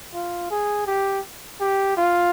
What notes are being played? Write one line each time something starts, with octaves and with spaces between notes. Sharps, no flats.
F4
G#4
G4
G4
F4